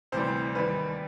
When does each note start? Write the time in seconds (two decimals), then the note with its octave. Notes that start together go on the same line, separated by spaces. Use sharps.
0.12 D2 C3 E3 G3 C5
0.55 D#2 D#3 G3 B4